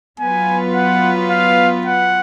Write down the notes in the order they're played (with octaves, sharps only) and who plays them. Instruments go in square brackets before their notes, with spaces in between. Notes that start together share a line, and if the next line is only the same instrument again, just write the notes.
[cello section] F#3 B3 F4 B4 [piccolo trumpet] G#5
[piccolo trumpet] F#5
F5
F#5